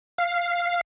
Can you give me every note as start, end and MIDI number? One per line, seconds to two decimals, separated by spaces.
0.18 0.81 77